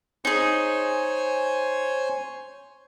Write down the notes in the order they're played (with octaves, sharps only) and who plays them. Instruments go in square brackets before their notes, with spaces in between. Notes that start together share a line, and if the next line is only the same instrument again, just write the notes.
[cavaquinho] D#4 G#4 [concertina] C5 C#5 G#5